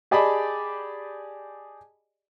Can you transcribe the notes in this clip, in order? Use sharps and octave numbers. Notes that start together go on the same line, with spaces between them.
G4 G#4 D5 D#5 A5 B5